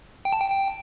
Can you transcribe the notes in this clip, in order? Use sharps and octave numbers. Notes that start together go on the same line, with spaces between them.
G5
A5
G5
G5